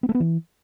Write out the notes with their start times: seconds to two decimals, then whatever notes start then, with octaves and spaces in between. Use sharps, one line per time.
0.03 B3
0.09 A3
0.15 B3
0.20 E3